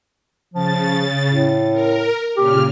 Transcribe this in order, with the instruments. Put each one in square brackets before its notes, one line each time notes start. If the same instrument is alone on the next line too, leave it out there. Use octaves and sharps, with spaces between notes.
[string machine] C#3 A6 [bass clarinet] F3
[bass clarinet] A2
[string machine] A#4
[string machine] A#2 C#3 F6 [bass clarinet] G4